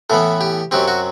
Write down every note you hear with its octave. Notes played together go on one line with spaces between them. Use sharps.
A2 E3 B3 A4
G4
F#2 F#3 C4 G4
F#4